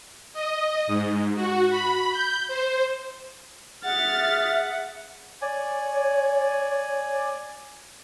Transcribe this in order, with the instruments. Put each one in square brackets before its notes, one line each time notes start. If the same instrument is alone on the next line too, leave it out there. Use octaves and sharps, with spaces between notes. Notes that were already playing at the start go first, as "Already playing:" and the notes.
[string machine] D#5
G#2
F#4
B5
G6
C5
[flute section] G#4 E5 [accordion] F#5 [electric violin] F6 A6
[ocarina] C#5 [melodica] D5 G#5